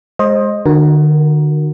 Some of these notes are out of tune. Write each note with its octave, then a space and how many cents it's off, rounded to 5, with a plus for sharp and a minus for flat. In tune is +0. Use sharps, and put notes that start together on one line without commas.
G#3 +0 C5 +25 D#5 +0
D3 +45 F#4 +0 A#4 +15